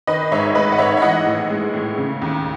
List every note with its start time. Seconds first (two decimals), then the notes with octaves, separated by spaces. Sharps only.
0.07 D#3 B4 D#5
0.32 G#2 C#5 E5
0.55 A3 B4 D#5
0.72 F#5
0.78 G#2 C#5 E5
0.97 E5
1.02 E3 D#5 F#5
1.27 A2
1.50 G#3
1.73 A2
1.97 C#3
2.22 D#2